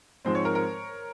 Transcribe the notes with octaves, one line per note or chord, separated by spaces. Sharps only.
G#2 F3 G#3 C4 C5
C#5
A#4
A#4